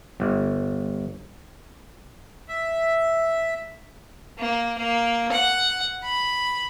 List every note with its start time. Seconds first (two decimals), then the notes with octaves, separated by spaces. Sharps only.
0.20 G1
2.48 E5
4.39 A#3
4.79 A#3
5.33 F#5
6.04 B5